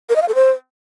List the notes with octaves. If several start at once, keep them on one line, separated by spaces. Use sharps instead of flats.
A#4
D#5
F5
A4
C5